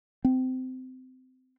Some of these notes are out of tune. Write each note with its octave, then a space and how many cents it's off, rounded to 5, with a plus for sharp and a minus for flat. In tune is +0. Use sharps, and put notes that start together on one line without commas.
C4 -25